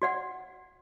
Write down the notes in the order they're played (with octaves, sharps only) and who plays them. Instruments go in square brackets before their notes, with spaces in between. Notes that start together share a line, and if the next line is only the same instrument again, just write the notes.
[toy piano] F#4 D5 F#5